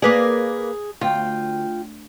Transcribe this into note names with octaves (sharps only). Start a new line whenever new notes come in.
A#3 G#4 B4 D5
D2 F4 G5